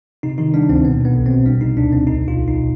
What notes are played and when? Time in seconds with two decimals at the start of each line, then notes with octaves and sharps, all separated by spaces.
0.23 C3 D#4
0.38 D#3 D#4
0.54 G3 D4
0.69 D2 C4
0.84 B2 B3
1.00 B2 B3
1.15 B1
1.26 C4
1.30 B2
1.45 G3 D4
1.61 C3 D#4
1.77 D2 D4
1.92 D2 C4
2.07 B1 D#4
2.22 B2
2.28 F4
2.38 B1
2.48 D#4
2.53 B2